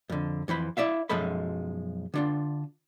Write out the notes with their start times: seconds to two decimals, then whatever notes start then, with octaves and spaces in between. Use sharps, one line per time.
0.09 F2 D3
0.48 F2 E3 C5 B5
0.77 E4 D5 E5 F5
1.09 B1 F#2 F3 G#3 A4 B5
2.14 D3 D4 F4